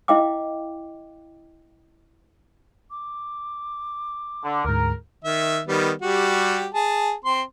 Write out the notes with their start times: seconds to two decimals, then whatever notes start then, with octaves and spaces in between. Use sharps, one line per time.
0.08 E4 D#5 F5 G5 D6
2.91 D6
4.44 D3
4.65 D2 G#2 A#4
5.24 D#3 E5
5.67 D#3 G3 B3
6.02 G3 F#4 G4
6.74 G#4 A5
7.25 C4 C6